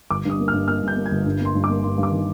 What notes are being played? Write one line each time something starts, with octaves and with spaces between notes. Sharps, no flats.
G1 D6
G2 D#6
A#3
F6
G2
A#3 F6
G2
G6
A#3
G#6
G1
G2
A#3 C6
G2
D6
A#3
G2 C6
G2
D6
D#3